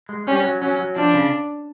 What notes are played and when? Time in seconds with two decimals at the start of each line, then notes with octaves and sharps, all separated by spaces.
0.09 G#3
0.27 G3 C#4
0.44 F#3
0.62 F#3 C#4
0.79 F#3
0.96 F3 D4
1.14 C#3